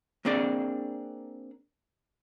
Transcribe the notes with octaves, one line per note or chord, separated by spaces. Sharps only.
A#3 C4 D4 G#4 D5